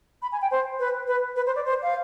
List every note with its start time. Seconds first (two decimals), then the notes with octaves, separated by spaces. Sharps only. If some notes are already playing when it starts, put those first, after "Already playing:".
0.22 B5
0.32 G#5
0.42 G5
0.51 C5
0.80 B4
1.08 B4
1.36 B4
1.46 C5
1.56 D5
1.65 C5
1.82 F5